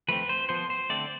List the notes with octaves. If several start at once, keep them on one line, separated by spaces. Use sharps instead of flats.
F3 A3 C4 B4
C5
F3 B3 C5
C5
D3 A3 C4 D5